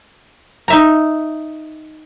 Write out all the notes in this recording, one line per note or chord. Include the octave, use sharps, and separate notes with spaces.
D#4 E5 A#5